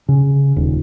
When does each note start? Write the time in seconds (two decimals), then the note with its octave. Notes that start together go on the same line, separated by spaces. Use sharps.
0.09 C#3
0.56 D#1